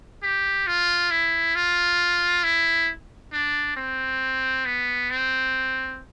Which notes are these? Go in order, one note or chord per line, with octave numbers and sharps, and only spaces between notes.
G4
F4
E4
F4
E4
D4
C4
B3
C4